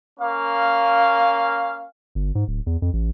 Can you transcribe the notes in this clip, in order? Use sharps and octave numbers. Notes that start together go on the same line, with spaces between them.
A#3 C#4 F5
G1
G#2
D1
E2
F2
A1